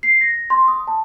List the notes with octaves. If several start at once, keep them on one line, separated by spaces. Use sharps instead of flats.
C7
A#6
C6
D#6
A5